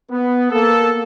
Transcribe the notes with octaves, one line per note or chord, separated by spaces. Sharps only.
B3
A#3 A4